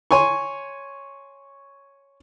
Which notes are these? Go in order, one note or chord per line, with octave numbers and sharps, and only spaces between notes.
C#5 G#5 C6 C#6